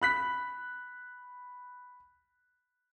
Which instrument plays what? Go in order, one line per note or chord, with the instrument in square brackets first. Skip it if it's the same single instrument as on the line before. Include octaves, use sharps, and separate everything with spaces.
[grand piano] B5 F#6 B6